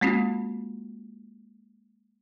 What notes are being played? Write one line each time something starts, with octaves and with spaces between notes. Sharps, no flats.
G#3 A#3 C4 C#4 F4 F#4